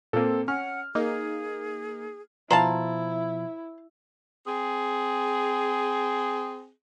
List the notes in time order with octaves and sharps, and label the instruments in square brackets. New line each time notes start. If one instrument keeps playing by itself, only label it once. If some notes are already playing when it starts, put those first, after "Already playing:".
[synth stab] A#2 A#3 [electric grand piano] C4 A4
[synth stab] C#4 [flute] F#5 [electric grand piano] F6
[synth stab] A#3 D#4 [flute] G#4
[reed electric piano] B2 F3 [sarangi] E4 [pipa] C5 F5 A5 [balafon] A#5
[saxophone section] C4 G#4